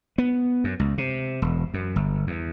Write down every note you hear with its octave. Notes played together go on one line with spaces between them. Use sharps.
B3
F#2
C#2
C3
E1
F#2
G1
E2